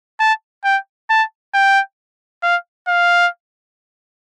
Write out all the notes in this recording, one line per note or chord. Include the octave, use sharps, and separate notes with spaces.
A5
G5
A5
G5
F5
F5